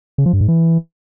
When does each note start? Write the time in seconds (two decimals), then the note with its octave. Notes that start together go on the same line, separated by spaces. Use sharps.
0.18 C#3
0.26 F3
0.33 G2
0.41 G#2
0.48 E3